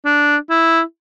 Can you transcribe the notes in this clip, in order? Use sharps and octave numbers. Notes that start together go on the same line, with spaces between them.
D4
E4